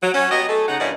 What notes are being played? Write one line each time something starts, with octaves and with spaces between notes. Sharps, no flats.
F#3
C#4 F#4
F#3 B3 G4 D#5
A3 G#4 A4
C#3 D#4 F#5
G2 E3 A#3 C#4 D5 D#5